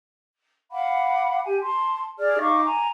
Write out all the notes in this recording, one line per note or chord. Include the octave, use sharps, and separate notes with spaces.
F5 F#5 B5 D6
G4 G#5
A5 C6
G#4 D5 F6
D#4 F5 C#6 D6
G#5 A#5